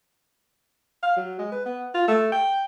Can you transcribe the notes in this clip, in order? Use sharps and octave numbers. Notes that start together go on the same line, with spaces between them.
F5
F#3
G#3
B4
B3
F4
A3
G5